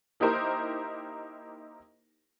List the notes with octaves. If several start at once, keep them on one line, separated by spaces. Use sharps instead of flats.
A#3 D#4 E4 G4 A#4 C5